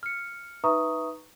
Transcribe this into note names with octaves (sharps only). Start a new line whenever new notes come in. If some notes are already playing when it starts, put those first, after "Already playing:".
F6 C#7
D#4 B4 E5 A#5 C#6 D#6